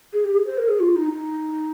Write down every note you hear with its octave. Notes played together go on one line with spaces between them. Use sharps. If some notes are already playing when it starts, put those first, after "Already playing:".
G#4
G4
G#4
C5
A#4
G#4
F4
D#4
D#4